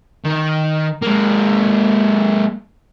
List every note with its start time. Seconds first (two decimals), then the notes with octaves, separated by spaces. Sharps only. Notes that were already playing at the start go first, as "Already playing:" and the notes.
0.25 D#3
1.03 G#3 A#3